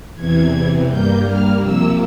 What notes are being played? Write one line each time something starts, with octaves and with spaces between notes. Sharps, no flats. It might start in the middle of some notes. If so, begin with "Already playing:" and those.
E2 C3 E3 G#6
G2 G3 A#3 G6
F6
C3 F3 A#3 E6